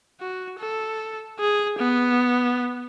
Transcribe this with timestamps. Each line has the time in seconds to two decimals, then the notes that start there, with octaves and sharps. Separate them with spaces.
0.21 F#4
0.60 A4
1.40 G#4
1.79 B3